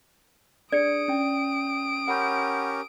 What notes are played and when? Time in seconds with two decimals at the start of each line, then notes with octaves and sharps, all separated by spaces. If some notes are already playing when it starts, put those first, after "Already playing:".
0.72 D4 G#4 D5 D#6 C#7 D7
1.08 C#4 G5
2.08 C#4 G4 A#4 F#5 B5 G6